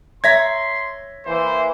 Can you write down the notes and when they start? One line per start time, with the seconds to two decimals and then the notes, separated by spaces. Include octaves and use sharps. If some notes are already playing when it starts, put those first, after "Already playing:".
0.24 C#5 E5 A#5 C6 G#6 A#6 B6
1.26 E3 A#3 C5